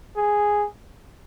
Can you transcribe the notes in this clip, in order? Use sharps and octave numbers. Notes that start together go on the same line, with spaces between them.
G#4